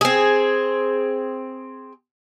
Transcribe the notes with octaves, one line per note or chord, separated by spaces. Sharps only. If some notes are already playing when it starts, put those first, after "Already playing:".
C4 G#4